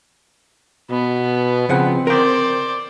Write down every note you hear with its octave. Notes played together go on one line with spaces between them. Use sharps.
B2 B3
C#3 F3 C4 F#5
A#4 C5 D5 G5